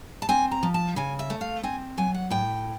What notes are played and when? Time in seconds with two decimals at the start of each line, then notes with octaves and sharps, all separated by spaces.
0.22 A5
0.29 C4 G#5
0.51 A#5
0.63 F3
0.74 A5
0.96 C#3 G#5
1.19 E5
1.30 A3
1.41 F5
1.63 C4 G#5
1.98 F#3 G#5
2.14 F#5
2.30 A2 G5